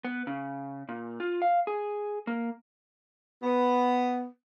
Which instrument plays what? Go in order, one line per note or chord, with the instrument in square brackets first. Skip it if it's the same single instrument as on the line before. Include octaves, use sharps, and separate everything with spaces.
[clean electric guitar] B3
C#3
A#2
F4
F5
G#4
A#3
[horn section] B3